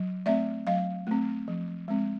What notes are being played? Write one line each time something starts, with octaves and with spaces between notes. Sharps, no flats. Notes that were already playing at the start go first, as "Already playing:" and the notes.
Already playing: F#3
A3 C4 D5 E5
F#3 D#5 F5
A3 C4
F3
G#3 C4